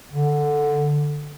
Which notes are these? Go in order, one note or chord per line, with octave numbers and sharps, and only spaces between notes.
D3